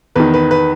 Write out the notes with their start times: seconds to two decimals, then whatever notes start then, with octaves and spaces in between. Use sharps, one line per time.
0.16 E2 D#3 B4
0.34 B4
0.51 B4